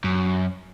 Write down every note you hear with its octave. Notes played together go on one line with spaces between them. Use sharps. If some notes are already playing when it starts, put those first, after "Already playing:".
F#2